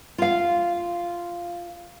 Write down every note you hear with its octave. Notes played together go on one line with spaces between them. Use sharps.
F4 F5